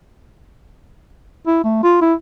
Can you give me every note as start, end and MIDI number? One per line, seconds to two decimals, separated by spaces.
1.47 1.61 64
1.64 1.82 57
1.84 1.97 65
2.02 2.14 64